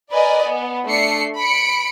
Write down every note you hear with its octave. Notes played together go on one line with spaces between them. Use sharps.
A#4 B4 D5 D#5 G#5
B3
A3 D4 C7 C#7
B5 C#7 D7